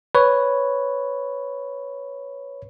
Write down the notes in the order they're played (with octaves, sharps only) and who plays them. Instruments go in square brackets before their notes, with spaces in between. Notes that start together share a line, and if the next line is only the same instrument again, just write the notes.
[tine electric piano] B4 C#5